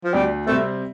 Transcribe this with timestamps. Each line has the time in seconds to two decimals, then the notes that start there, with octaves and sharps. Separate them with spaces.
0.04 F3
0.14 D2 G3
0.47 C3 G3 A3 C4